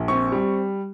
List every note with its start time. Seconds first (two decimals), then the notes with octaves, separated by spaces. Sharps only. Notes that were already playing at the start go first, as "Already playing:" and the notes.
Already playing: A#1
0.08 C4 C#6
0.32 G3